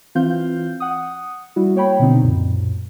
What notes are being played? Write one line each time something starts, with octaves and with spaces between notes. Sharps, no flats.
E3 C4 F4 F5 G6
F#5 D#6
G3 E4 F#4
A#3 C#5 G5 B5
B2 D3 C4 D#4
C#2 F#2 A#2